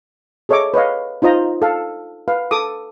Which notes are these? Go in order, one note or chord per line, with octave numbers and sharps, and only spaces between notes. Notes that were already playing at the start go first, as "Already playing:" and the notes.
G#4 A4 C#5 D#5 E5 D6
B4 C#5 D#5 F5
D#4 F4 C5 D#5 A#5
A4 F5
B4 F5
A4 D6 D#6